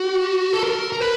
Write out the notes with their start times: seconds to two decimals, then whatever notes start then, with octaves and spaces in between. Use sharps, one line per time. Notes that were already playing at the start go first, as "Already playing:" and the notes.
Already playing: F#4
0.53 A4
0.63 A#4
0.93 A#4
1.00 B4